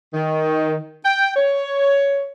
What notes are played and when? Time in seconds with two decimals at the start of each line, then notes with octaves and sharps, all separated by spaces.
0.14 D#3
1.04 G5
1.36 C#5